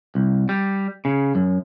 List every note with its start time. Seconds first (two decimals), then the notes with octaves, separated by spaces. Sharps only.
0.15 C2
0.49 G3
1.05 C#3
1.35 F#2